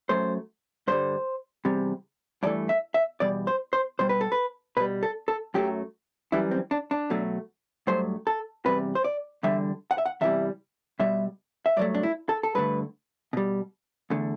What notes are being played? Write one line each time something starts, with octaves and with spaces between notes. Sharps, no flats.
F#2 F#3 A3 C5
G2 D3 G3 C5
E2 C3 G3
G2 E3 A3 D5
E5
E5
E2 B2 G3 D5
C5
C5
B2 G3 C5
B4
A4
B4
B2 G3 B4
A4
A4
F#2 F#3 A3 G4
F#2 E3 G3 E4
C4
D4
D4
B2 F#3 A3
G2 F#3 A3 C5
A4
E2 C3 G3 B4
C5
D5
E2 D3 G3 E5
F#5
E5
F#5
E2 C3 E3 G3 E5
B2 G3 E5
E5
G2 F#3 A3 D5
D4
E4
A4
A4
G2 D3 A3 B4
B2 G3
E2 D3 A3